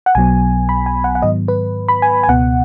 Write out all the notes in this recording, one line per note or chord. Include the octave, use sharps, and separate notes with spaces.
F#5
B1 B2 F#3 B3 G#5
B5
G#5
F#5
F#5
G#2 D#3 F#3 B3 D#5
B4
B5
G#5
G#5
C#2 B2 B3 F#5